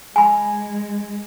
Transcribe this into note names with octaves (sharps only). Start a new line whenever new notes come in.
G#3 G#5 B5